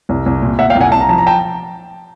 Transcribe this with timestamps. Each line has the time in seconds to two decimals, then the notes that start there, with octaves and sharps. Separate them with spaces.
0.09 C2
0.26 C2
0.42 A#2
0.59 A#2 E5 F#5
0.70 F5 G5
0.75 C2
0.81 F#5 G#5
0.92 C2 A5
1.01 A#5
1.09 F3 A5
1.18 A#5
1.27 G5 A5